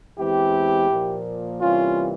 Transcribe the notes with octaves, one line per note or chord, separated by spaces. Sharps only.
E2 E3 G#3 C4 E4 G4
A#2 F3 A#3
C3 E3 G3 A#3 C#4 F4